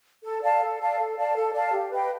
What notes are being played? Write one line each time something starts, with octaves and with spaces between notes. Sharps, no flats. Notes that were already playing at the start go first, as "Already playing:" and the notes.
A4
D5 F5 A5
A4
D5 F5 A5
A4
D5 F5 A5
A4
D5 F5 A5
G4
B4 D#5 G5